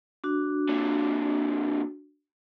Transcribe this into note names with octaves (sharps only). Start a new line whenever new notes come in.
D4 F#4
A#2 D3